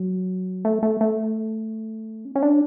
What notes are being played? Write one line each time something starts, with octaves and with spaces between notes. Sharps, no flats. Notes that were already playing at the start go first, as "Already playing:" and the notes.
Already playing: F#3
A3
A3
A3
C#4
C#4
D4